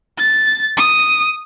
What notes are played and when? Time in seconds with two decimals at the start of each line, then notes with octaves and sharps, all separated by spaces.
0.18 A6
0.77 D#6